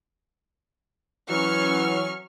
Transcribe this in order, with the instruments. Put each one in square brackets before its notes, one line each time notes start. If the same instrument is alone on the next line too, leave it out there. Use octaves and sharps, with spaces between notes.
[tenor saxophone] E3 [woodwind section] F#3 [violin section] C#4 C#6 F6